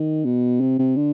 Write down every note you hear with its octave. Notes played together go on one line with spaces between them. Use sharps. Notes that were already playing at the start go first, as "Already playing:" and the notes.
Already playing: D#3
B2
C3
C3
D3